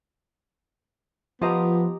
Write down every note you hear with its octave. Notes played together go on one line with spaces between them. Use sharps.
F3 B3 G4 D#5 A#5